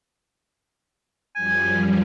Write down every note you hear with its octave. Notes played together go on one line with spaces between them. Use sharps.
F#2 F3 G3 G#5